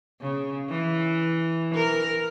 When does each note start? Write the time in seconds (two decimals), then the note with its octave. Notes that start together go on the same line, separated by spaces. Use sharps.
0.21 C#3
0.69 E3
1.74 A#4